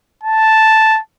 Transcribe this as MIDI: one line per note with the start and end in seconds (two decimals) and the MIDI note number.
0.24 0.99 81